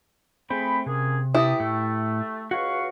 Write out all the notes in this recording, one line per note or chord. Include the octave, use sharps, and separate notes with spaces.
A3 C4 G#4 C5 B5
C3 A#3 C#4 G#4
E3 E4 G4 A5 D#6
A2 A3
C#2 F#4 B4 C#5 F5 C#6